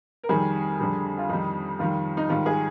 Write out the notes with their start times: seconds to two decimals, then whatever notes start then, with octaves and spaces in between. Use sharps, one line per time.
0.24 A#4
0.29 F2 D#3 G3 G#4
0.79 F2 D3 G3
1.18 F4
1.29 F2 D#3 G3 D#4
1.79 F2 D#3 G3 F4
2.17 D#4
2.29 G#2 D#3 G3 F4
2.46 G#4